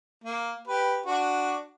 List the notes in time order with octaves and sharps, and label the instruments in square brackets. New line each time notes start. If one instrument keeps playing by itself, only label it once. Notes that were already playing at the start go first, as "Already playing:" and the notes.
[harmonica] A#3
G4 B4
D4 F#4